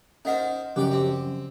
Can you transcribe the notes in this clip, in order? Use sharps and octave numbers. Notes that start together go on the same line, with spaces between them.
C#4 D#4 A#4 C5 D#5 F#5
F#2 C#3 F3 G4 D5
C4